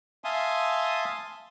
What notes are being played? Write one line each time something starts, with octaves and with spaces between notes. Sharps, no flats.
E5 F5 G#5 A5 C6 D#6